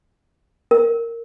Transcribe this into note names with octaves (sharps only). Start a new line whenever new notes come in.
A#4